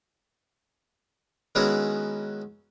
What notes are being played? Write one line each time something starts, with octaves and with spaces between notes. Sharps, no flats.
D#3 G#3 B3 C#4 E4 F#4